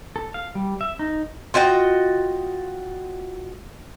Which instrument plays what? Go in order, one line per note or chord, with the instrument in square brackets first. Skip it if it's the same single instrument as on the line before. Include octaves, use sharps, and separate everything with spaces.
[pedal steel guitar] A4
F5
G3
E5
D#4
[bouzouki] F4 F#4 D#5 G5